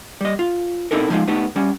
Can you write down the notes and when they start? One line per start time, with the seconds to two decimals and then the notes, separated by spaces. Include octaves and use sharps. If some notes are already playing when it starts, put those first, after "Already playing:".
0.21 G3 D#5
0.39 F4
0.91 B2 C4 D#4 E4 A4 A#4
1.10 F3 G3 G#3 D#4 F4
1.27 A3 B3 D#4 G4
1.56 G3 C#4